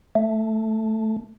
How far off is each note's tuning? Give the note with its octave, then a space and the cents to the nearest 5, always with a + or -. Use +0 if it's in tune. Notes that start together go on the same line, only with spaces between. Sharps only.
A3 +0